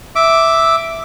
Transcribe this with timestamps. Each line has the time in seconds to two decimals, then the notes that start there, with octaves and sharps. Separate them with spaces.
0.16 E5 D6